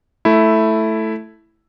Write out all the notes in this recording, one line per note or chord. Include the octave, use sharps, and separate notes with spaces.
A3 E4